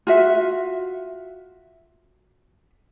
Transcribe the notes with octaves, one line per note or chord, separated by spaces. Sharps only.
F4 F#4 E5